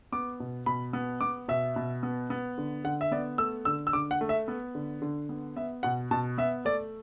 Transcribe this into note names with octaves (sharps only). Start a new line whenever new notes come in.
B3 D6
B2
B2 B5
B3
B3 D6
B2 E5
B2
B3
B3
D3
D3 F#5
E5
B3 D5
A3 E6
D3 E6
E6
D3 D6
F#5
A3
E5
B3
D3
D3
B3
B3 E5
B2 F#5
B2 A5
B3 E5
A3 D5